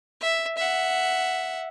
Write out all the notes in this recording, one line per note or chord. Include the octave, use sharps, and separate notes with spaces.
E5
E5 F#5